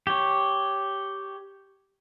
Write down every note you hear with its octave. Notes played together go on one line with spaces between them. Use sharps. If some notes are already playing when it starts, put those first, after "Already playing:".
G4 C#5